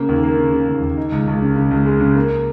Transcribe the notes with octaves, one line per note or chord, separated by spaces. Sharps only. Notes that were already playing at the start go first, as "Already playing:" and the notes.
Already playing: C#3 A#3
D#2
A#3
C#3
C#3
D#2
D#2
D#4
C#2
C#2
C#3
C#3
C#2
G#3
C#3
A#3